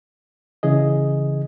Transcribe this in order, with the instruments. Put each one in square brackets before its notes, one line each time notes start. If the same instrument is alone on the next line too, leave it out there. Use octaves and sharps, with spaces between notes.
[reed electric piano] C#3 E3 G#4 D#5